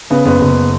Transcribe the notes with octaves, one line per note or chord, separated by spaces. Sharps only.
C#3 B3
F#1 B3
F#1